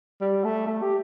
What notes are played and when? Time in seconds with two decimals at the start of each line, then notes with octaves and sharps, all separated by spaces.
0.21 G3
0.44 A3
0.67 A3
0.82 G4